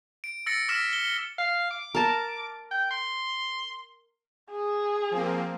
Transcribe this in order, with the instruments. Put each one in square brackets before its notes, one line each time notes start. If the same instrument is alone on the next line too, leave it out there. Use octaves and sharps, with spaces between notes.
[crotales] D7
E6 A6 A#6 C#7
D6 E6 F6 A#6 B6 E7
G7
[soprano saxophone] F5
D6
[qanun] A#4 A5
[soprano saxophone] G5
C6
[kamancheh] G#4
[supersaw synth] F3 A#3 C4